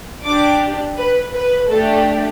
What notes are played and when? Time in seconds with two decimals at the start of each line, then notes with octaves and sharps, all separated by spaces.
0.24 D4 G4 D6
0.96 B4
1.33 B4
1.69 A3 D4 G4 A4